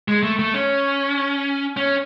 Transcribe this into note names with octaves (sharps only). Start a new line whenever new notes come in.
G#3
A3
A3
C#4
C#4